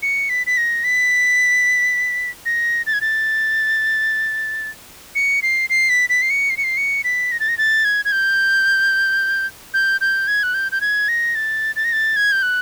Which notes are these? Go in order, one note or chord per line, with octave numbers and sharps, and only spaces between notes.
C#7
B6
B6
A#6
B6
A#6
A6
G#6
A6
C#7
C7
C7
B6
B6
C7
C#7
C7
C#7
C7
C#7
B6
A#6
A6
A#6
A6
G#6
G#6
G6
G6
G6
G#6
F#6
G6
G6
G#6
A#6
A6
A6
A#6
A6
G#6
G6
F#6